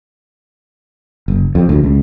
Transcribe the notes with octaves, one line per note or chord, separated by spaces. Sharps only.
F#1
F2
D2
C#2